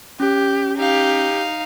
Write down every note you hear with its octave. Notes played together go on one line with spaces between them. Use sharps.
C#4 G4
D#4 G4 F5